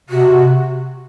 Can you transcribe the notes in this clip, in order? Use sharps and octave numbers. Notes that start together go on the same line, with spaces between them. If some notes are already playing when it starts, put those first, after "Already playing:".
C3 F#4